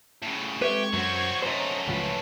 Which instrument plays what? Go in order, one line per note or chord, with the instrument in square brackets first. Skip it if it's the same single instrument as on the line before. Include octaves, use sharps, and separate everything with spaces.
[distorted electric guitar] A2 C#3
[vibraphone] G#3 C4 A4 [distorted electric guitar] G4 [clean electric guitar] B4 E5 [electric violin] C#6 G#6
[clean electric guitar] F#2 [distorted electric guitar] F#3 C4 [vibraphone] F#4 C5 F#5
[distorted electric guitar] F#2 A3 [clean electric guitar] C5 [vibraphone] C#5 [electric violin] D#5 A#5
[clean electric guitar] C#2 A2 F3 [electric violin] B4